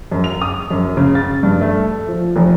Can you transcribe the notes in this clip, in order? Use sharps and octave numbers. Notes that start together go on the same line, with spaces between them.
F#2
F7
D#6
F#2
C#3
A6
G2
A3
F3
F1